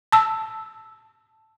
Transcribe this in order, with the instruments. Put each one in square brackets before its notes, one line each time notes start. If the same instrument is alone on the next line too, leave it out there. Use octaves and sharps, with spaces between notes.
[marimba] A5 E6